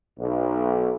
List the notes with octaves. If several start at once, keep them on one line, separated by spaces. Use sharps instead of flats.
B1